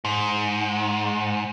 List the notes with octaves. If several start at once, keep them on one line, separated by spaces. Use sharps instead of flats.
G#2